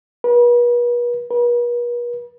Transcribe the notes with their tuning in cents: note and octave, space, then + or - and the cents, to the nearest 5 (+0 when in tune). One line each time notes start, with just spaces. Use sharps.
B4 -40
B4 -45